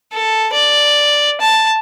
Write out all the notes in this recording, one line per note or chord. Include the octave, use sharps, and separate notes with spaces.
A4
D5
A5